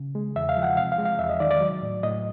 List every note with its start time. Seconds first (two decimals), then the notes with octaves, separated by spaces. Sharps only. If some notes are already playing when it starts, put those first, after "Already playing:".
Already playing: C#3
0.15 G#3
0.36 E2 E5
0.49 F5
0.57 F3
0.63 F#5
0.77 C3 F5
0.92 F5
0.98 G#3
1.05 F5
1.19 E2 E5
1.29 D#5
1.40 D#3 D5
1.51 D5
1.61 F#3
1.82 A2
2.03 A2 D#5